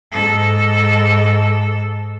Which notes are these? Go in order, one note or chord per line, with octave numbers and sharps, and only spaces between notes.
G#2 A4